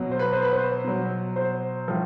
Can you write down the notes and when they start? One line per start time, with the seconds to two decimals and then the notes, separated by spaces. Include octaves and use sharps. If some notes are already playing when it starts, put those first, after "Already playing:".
Already playing: B2 F#3
0.11 C5
0.19 B4
0.33 C5
0.43 B4
0.53 C5
0.84 B2 F#3
1.36 C5
1.88 A2 F3